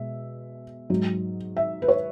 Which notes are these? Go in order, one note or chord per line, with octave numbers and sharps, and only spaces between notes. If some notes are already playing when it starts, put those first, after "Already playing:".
Already playing: B2 G#3 E5
G#2 F#3
E5
B4
C#5